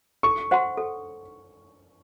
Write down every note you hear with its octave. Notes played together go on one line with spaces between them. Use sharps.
A4 C#6
C5 F#5 C6
A4